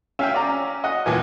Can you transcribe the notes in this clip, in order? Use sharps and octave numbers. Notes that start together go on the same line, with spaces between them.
C#4 E5 F5 G5
D5 A#5
D#5 F#5
D#2 A#2 E3 G#5